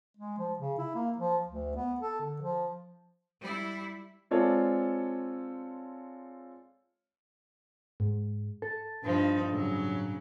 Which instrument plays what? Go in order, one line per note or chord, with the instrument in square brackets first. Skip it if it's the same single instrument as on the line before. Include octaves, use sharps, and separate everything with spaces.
[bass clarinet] G#3
F3
C#3
E4
A#3
F3
D2
B3
A4
D3
F3
[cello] G3 E4
[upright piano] G#3 C4 F4 A4 C#5 D5
[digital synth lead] G#2
A4
[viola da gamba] G2 F3 D#4
[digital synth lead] A2 [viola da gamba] C#3 F#3